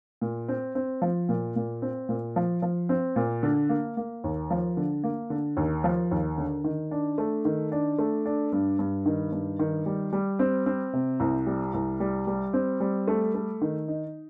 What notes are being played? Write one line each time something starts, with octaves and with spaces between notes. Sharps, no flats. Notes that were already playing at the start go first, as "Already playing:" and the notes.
A#2
C4
C4
F3
A#2
A#2
C4
A#2
F3
F3
C4
A#2
D3
A#3
A#3
D#2
F3
D3
A#3
D3
D#2
F3
D#2
D3
D#3
D4
A3
D#3
D4
A3
D4
G2
G2
D#3
G2
D#3
G3
G3
C4
C4
C3
C2
G3
C2
G3
G3
C4
G3
A3
A3
D#3
D#4